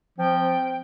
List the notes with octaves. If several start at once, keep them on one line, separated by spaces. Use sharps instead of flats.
F3 C4 G5